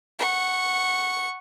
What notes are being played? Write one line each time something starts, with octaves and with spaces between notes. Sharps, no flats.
F#5 C#6